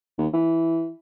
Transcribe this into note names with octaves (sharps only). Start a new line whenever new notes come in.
D#2
E3